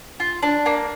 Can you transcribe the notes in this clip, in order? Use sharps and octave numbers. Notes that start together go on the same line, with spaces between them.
F4
D4
A#3